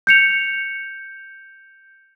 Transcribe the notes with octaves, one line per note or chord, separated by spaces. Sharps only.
G6 C#7 F7